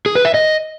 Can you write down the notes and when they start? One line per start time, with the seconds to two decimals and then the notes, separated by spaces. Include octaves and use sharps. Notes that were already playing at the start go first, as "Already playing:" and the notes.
0.06 G#4
0.15 B4
0.25 E5
0.34 D#5